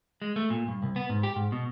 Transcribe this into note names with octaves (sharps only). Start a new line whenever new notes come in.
G#3
A3
A#2
G2
C2
B3
G#2
G4
G#2
B2